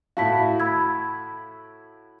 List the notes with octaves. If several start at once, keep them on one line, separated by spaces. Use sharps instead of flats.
A2 E4 F#4 F5 A5 B6
B5 E6 G#6